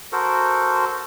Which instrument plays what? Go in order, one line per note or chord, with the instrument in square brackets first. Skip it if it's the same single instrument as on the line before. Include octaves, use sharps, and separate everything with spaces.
[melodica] F#4 A4 A#4 C5